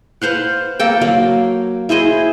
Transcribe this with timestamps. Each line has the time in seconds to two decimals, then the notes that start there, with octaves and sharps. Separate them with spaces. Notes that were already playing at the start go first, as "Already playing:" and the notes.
0.22 B4 C5 F5 F#5
0.79 A#3 A4 G5
1.01 F#3 A#3
1.89 E4 G#4 C5 D#5